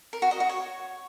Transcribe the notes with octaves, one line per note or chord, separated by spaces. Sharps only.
A#4
F#4
D#5
F#4
C#5